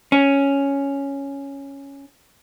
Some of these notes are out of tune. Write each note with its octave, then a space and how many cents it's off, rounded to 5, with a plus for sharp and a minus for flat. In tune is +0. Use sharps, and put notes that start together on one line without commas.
C#4 +0